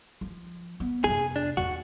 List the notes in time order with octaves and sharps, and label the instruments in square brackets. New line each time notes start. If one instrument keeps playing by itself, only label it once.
[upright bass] F3
B3
[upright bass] F2 C3 [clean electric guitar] G#4
[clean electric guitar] D4
[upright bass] D#2 [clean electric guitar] F#4